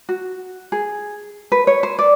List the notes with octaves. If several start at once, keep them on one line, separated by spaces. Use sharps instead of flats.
F#4
G#4
B4
C#5
C5
D5